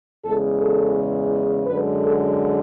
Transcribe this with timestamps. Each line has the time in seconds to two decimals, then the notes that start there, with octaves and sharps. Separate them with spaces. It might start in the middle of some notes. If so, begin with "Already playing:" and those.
0.24 E2 C#3 G#3 A4
0.60 A4
1.67 F#2 D3 G#3 B4
2.03 A4